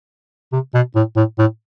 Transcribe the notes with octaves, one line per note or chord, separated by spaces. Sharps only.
C3
B2
A2
A2
A2